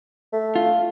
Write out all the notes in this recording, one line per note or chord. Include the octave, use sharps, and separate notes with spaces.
A3
F4